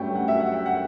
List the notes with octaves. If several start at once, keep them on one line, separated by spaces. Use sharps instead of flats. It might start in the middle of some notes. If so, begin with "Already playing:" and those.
Already playing: G2 F#3 A3 C#4 G5
F#5
E5
F#5
G5
F#5